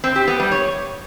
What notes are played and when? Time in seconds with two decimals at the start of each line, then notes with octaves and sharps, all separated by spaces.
0.04 C4
0.16 G4
0.28 B3
0.40 G3
0.52 C#5